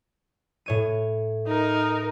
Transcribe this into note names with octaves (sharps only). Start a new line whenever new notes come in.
A2 C#5 D#7
D#4 A#4